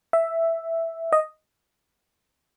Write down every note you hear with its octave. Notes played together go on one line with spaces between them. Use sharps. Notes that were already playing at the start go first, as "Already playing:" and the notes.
E5
D#5